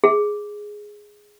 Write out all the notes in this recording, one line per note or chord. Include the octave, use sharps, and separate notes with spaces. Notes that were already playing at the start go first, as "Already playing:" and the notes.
G#4